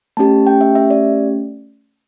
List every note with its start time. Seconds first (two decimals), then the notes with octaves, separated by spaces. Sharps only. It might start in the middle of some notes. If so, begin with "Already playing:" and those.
0.17 A3 C#4 G4 A5
0.47 G5
0.61 E5
0.75 E5
0.90 D5